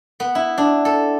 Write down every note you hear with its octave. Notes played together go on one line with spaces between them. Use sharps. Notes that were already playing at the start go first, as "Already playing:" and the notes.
B3
E4
D4
A4